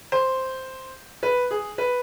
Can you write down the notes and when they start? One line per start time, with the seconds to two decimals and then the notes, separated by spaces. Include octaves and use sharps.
0.12 C5
1.23 B4
1.51 G#4
1.78 B4